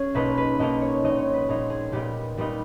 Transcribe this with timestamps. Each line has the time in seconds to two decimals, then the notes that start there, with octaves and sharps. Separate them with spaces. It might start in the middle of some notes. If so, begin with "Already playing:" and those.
Already playing: C#4 G#4
0.14 B1 B2 A#3 D#4 B4
0.38 B4
0.59 B1 B2 A#3 D#4 D#5
0.81 C#5
1.03 A#1 A#2 G#3 D#4 D#5
1.19 C#5
1.34 B4
1.48 A#1 A#2 G#3 D#4 G#4
1.70 G#4
1.92 A#2 G3 B3 D#4 G4
2.37 A#2 G3 B3 D#4